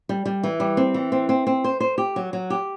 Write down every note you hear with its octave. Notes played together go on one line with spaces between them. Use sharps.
G3
G3
E3
G3
C4
E3
C4
C4
C4
C5
C5
G4
F#3
F#3
G4